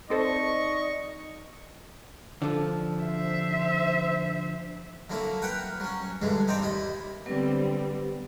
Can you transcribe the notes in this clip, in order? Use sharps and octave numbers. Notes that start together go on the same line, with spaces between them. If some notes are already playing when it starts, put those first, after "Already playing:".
C4 D#4 A4 C5 D5 D#5 C#6
D3 F3
C5 E5
D3 F#3 A#3 E4
A#4 B4 F#5 G5
F#3 C#4
G2 D3 E3 G#3
C4 D#4 D5 G5
D#2 E4 D#5
D3 F#3 G3 B3 C4 B4